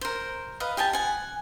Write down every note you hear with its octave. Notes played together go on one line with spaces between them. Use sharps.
A#4 C5
B4 D#5 F5
G4 D#5 G#5 A5
F#5 G#5